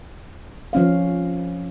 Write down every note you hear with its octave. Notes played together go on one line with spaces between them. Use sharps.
F3 C#4 F5